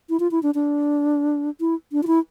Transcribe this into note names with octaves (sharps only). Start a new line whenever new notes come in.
E4
F4
E4
D4
D4
E4
D4
F4
E4